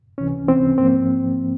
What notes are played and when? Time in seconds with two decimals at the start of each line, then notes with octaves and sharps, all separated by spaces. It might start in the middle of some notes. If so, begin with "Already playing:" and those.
0.18 C#2 C3 E3 C#4
0.48 C#2 C3 E3 C4
0.78 G#2 F3 A#3 C4